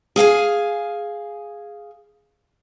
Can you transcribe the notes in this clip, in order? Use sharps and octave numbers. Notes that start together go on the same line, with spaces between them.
G#4 F5 F#5 G#5